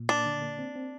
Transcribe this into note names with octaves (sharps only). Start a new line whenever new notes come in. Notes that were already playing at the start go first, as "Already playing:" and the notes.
Already playing: A#2
A#3 D4
D3
A#3
C4
C4